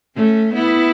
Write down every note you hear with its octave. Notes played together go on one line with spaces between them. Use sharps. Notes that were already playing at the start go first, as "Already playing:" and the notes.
A3 C#4
B3 E4